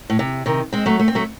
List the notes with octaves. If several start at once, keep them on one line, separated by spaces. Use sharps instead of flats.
A2
C3
C3 D#3
G#3 C4
F#3 A3
A3
C4
F#3 A3